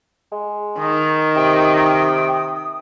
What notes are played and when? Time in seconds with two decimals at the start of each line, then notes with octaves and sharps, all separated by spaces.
0.32 G#3
0.79 D#3 D#6
1.36 C3 G5